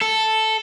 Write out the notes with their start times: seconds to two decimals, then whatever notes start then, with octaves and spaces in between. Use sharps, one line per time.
0.01 A4